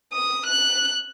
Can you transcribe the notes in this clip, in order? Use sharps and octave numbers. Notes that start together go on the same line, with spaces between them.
D#6
F#6